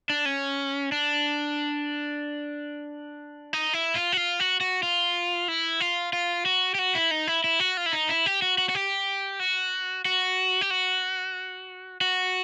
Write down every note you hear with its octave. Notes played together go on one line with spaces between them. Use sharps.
D4
C#4
D4
D#4
E4
F4
F#4
F4
F#4
F#4
F4
E4
F4
F4
F#4
G4
F#4
E4
D#4
E4
E4
F#4
F4
E4
D#4
E4
G4
F#4
F#4
F#4
G4
F#4
F#4
G4
F#4
F#4